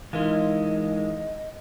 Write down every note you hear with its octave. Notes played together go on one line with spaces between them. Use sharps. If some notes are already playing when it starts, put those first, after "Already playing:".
E3 G#3 D#4 F4 A#4 D#5 F5